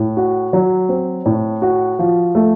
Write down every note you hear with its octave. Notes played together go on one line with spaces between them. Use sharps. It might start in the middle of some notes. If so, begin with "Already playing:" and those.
Already playing: A2
F#4
F#3
C4
A2
F#4
F3
A3